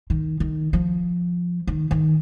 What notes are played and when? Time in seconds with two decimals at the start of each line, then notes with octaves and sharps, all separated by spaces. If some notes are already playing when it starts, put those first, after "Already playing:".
0.10 D#3
0.40 D#3
0.73 F3
1.67 D#3
1.91 D#3